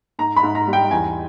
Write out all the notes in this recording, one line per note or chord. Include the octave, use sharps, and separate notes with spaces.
G#2 A#5
B5
G#2
A#5
G3
G5
E2 G#5